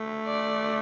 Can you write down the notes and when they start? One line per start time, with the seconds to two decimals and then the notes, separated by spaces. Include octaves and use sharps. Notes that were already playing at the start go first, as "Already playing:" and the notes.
Already playing: A3
0.27 D5